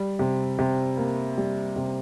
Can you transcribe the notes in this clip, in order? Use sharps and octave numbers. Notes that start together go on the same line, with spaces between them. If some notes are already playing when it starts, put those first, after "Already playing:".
Already playing: G3
C3
C3
A#3
G3
C3